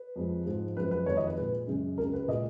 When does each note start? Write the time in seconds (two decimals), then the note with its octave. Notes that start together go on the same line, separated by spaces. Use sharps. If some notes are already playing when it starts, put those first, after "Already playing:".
Already playing: B4
0.16 F2 F3 G#3
0.46 G#2 F3 G#3
0.77 F#2 F3 G#3 B4
0.91 B4
1.06 F2 D#3 G#3 C#5
1.17 D#5
1.27 B4
1.37 A#2 G#3 B4
1.67 F#2 C#3 G#3
1.98 C#2 C#3 G#3 A#4
2.13 B4
2.28 A#2 G#3 D#5